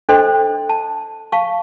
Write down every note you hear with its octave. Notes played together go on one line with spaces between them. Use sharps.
D4 A4 C5 D#5 G5 C6
A5
F5 A5 C#6